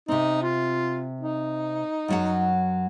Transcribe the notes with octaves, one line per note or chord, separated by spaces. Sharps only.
C3 C4 D#4
F4
D#4
F#2 F#3 F#5